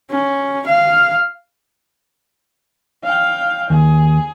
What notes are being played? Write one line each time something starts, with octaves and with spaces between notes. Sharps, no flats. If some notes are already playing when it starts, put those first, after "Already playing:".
C#4
F5
F5 G5
D#2 G#4